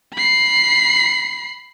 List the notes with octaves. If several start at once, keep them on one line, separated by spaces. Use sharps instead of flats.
B5 C7